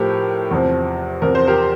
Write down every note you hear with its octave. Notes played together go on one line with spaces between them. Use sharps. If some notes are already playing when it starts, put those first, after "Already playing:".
Already playing: A2 F3 G4 A#4
E2 C3 F3
E2 C3 F3 A#4
C5
G4 A#4